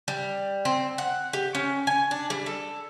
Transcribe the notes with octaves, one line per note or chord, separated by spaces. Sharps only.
G3
C4
F#5
G4
C#4
G#5
D4
G3
A4